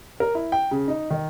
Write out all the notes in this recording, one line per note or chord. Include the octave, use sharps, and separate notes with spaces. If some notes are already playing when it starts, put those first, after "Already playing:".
A#4
E4
G5
C#3
D#4
D#3